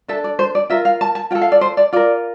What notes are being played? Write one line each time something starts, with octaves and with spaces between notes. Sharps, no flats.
D4 A4 E5
D5
C5
D5
F4 A#4 E5
F5
A5
A5
F4 A4 G5
F5
D5
C5
D5
F4 A#4 D5